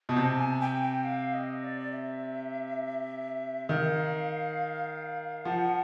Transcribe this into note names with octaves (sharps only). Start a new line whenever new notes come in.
B2
C3 A5
G#5
G5
G5
F5
D#5
D5
E5
D#3 F5
F3 F#5